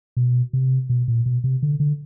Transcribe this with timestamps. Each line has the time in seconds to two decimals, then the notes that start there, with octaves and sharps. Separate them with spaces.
0.17 B2
0.53 C3
0.90 B2
1.08 A#2
1.26 B2
1.44 C3
1.63 D3
1.80 D3